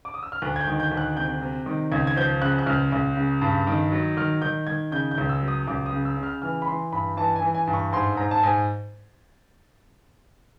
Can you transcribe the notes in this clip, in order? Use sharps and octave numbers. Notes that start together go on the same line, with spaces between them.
D6
D#6
E6
F6
D2 F#6
G#6
G6
D#3
G6
D2
F#6
C3 G6
C3
D#3
C#2 G#6
G#6
F3 G6
C#3 F#6
F#6
C#2 F6
C#2
C#3
G2
D#3
F#3
D#3 F6
D#3 G6
D#3 G#6
C#3 G6
G6
C#2
E6
F#3
D#6
C#2 D6
D#6
C#3
E6
C#3
F6
E3 F6
B5
E3 C6
G2 B5
E3 A5
G#5
E3
G#5
G2
C#6
G#2 C6
G#2 A#5
A5
G#2 G#5